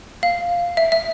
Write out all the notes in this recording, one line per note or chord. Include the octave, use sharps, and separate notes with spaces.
F5
E5
E5